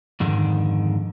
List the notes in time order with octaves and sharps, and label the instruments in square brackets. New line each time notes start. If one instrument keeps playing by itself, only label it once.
[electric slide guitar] F2 G#2 D3 D#3